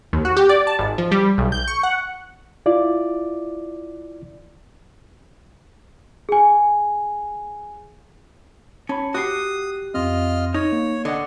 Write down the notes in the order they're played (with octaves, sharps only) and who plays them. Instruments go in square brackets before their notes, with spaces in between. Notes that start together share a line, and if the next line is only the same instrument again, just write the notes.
[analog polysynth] D#2
F#4
G4
D5
A5
G#1
F3
G3
B1
G6
C#6
F#5
[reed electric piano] E4 F4 D5
[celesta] G#4 G#5
[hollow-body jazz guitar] C#4 [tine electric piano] A5 B5
[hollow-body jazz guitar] F#4 G4 [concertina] D#6 [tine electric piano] F#6 C7
[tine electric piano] F2 C4 [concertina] F4 D#5 F6
[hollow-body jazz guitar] D#4 [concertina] C#5
[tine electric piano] A#3
[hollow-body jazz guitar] D3 F#5 [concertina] D#5